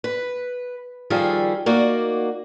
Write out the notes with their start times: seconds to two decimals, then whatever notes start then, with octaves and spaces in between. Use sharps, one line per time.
0.04 B4
1.10 D#3 F3 G3 G#4 A4 F5
1.66 A#3 D#4 F#4 D5